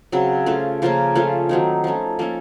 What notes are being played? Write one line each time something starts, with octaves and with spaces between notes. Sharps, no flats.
C#3 F#3 C4
A3 C#4 F4
C#3 F3 A#3 C#4
F3 A3 C#4 F4
D#3 F#3 C4 D#4
F3 A3 C#4
F3 A#3 C#4 A4